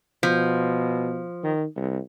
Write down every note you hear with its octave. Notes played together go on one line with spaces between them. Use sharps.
B2 F3
D#3
C2